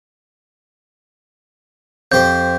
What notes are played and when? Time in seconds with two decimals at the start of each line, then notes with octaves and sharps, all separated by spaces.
2.12 F2 G4 C5 G6